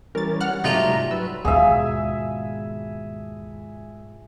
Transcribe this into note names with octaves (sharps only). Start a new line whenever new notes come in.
E3 G3 C#4 A#4 A6
F#5 F6 F#6
G#2 C3 F#3 G3 A3 D#4 F4 A#5
F#3 B4 E6
D#2 G#2 B2 D4 E4 F4 G#4 E5